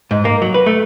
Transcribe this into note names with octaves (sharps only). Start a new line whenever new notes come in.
G#2
A#3
F#3
B4
A3